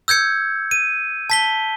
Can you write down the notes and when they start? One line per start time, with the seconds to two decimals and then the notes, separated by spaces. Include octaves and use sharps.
0.08 E6 G6 G#6 C#7
0.71 D#7
1.30 A5 B6 G7